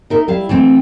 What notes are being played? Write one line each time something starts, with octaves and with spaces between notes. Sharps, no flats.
D#4 A#4 E5
G3 E4 F5
E3 A3 C4